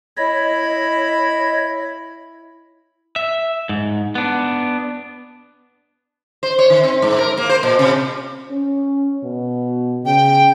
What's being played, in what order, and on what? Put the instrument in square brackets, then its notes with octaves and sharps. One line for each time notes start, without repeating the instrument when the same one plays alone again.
[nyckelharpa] E4 B5 [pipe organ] C#5 D#5
[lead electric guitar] E5
G#2
B3 D4
[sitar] C5
C#5
D#3
C4
G#2
A#4
A#3
C5
A#2
C3
[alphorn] C#4
B2
[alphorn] C#3 [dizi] G5